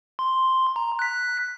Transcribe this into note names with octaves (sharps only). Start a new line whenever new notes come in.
C6
A#5
F#6 B6